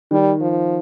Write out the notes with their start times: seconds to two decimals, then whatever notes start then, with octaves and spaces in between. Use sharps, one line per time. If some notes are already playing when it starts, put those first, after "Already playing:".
0.11 D#3 G3
0.41 F3